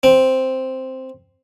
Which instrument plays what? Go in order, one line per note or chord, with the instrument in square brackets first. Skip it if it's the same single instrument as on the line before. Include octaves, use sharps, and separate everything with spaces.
[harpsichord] C4